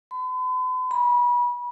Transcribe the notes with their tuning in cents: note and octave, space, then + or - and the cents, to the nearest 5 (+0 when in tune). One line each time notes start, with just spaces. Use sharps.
B5 +45
B5 -30